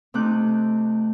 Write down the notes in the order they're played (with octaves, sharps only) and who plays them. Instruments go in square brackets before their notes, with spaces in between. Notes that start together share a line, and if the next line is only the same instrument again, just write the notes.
[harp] C3 A3 C4 D#4 D6 F#6